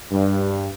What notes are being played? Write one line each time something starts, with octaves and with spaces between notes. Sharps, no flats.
G2